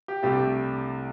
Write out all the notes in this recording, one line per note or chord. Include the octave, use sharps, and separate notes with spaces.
G4
C2 C3 A3 D4 G4